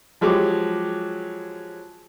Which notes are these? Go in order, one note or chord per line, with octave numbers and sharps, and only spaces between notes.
F3 F#3 G#3 G4 D6